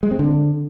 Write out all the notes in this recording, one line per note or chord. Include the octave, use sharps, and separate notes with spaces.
G#3
C4
D3